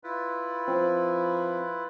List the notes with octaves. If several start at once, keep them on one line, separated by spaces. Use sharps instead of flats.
E4 F4 B4
F3 C4